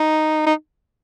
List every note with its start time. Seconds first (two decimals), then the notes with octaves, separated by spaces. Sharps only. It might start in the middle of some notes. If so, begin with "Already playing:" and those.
Already playing: D#4
0.47 D#4